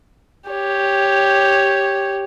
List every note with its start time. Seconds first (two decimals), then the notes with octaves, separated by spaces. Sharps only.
0.50 G4 C#5